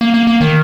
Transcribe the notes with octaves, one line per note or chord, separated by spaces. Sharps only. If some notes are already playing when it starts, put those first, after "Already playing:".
A#3
A#3
A#3
D#3